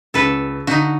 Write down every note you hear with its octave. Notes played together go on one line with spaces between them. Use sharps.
C#2 A4 B4
D3 D#4 F#4 B6